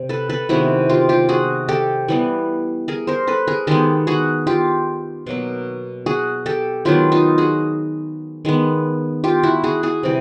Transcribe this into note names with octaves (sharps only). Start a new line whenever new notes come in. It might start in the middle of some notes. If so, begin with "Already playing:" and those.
Already playing: C3
A4 B4
A4 B4
C3 D#3 G#3 B3 E4 F#4
F4 G4
F4 G4
F#4 G#4
G4 A4
E3 G3 B3
G#4 A#4
A#4 C5
A4 B4
G#4 A#4
D#3 G#3 B3 G4 A4
F#4 G#4
F4 G4
B2 F#3 A#3
F#4 G#4
G4 A4
D#3 F#3 B3 F4 G4
D#4 F4
F#4 G#4
D#3 G#3 B3
F4 G4
E4 F#4
F#4 G#4
F#4 G#4
C3 E3 G3